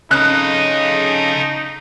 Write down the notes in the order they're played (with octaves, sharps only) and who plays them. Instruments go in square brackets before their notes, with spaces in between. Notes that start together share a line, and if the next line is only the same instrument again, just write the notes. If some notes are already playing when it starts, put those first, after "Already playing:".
[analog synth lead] C#3 [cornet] D#4 [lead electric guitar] A4 D#5 [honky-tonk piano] F#6